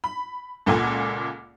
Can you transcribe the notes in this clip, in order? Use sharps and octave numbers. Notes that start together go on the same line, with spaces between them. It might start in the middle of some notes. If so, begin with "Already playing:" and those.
B5
C#2 A#2 A4 F#5 G#5